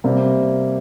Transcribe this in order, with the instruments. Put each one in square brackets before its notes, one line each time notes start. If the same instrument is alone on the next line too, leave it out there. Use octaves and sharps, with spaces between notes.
[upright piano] C3 G3 A#3